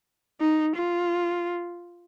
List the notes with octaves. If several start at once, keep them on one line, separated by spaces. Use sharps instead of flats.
D#4
F4